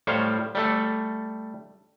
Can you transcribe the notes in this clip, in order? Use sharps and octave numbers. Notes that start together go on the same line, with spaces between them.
A2 G3 C5 C#5 F5
G3 A3 A4